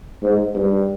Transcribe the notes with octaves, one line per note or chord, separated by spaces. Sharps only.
G#2
G2